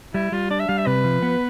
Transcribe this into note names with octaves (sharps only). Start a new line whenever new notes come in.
G3 E4
G3 F4
D4 D5
E5
G3 F5
E5
C3 B4
F3
B3